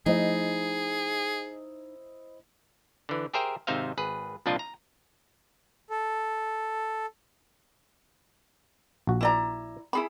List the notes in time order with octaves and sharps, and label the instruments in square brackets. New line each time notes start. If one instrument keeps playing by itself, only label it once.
[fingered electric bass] F3 A3 [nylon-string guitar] D#4 [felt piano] E4 C5 D#5 [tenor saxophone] G#4
[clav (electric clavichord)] D3 E3
G4 G#4 A#4 C5 E5 G5
G#1 C3 D#4 C5 E5 F5
G#1 G#4 B4
C2 A#2 F3 D4 F4 D#5
A#5
[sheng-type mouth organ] A4
[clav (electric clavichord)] A#1 F#4
[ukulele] E4 D5 A#5
E4 G#4 B5